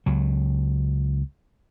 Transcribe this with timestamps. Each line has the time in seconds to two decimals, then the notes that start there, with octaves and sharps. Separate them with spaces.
0.06 C#2 F#3